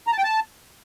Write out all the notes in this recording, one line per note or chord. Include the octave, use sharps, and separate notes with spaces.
A#5
A5
G5
A5